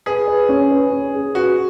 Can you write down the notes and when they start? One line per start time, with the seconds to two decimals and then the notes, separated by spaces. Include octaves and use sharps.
0.06 G#4 B4
0.28 B4
0.49 C#4
0.71 B4
0.92 C#4
1.15 G#4
1.35 F#4 B4